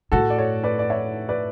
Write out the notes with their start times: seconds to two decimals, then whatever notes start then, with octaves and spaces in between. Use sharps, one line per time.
0.12 A2 F#4 A4
0.30 D5
0.38 A4 C#5
0.64 B4 D5
0.79 D5
0.90 C#5 E5
1.29 B4 D5